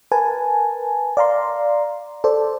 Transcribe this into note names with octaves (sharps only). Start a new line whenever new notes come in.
A#4 B4 G#5 A5
D5 F5 A#5 C6
A4 C5 D5